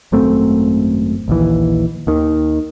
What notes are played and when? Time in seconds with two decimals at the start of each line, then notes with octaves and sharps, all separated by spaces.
0.12 G#1 F#2 A3 C4
1.28 A#1 D#2 E3
2.07 D#2 D#3